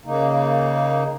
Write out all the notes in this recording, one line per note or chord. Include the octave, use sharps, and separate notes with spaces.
C#3 A#3 D#4